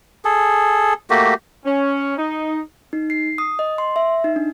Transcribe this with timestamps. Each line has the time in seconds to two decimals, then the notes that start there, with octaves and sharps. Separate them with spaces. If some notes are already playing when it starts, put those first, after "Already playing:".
0.25 G#4 A4
1.10 A3 A#3 F#4 G4
1.65 C#4
2.18 D#4
2.93 D#4
3.10 C7
3.38 D#6
3.59 D#5
3.78 C6
3.96 E5
4.24 D#4
4.36 D4